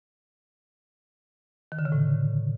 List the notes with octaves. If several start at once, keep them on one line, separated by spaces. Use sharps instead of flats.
D#3
D3
C#3
A2